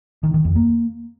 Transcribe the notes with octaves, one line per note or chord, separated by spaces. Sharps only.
D#3
D#3
F2
A#3